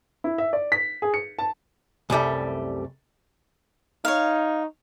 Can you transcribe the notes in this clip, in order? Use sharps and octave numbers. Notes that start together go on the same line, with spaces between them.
E4
E5
D5
B6
G#4
C#7
A5
C2 F#2 G3 A3
D#4 C#5 F5